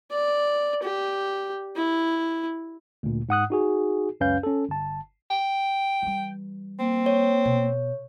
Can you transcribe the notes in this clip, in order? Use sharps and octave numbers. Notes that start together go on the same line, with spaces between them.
D5
G4
E4
D2 A#2
G#2 F#5 D#6 F#6
D#4 F#4 G#4
C#2 F#2 C#4 B4 F5 G6
C#4 A4
G1 A5
G5
E3 G3
A#3 C4
C#5
B2